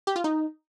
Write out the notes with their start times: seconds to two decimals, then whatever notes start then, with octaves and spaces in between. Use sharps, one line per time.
0.07 G4
0.16 F4
0.24 D#4